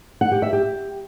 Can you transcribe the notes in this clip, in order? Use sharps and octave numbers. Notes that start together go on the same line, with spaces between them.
F#5
G4
E5
G4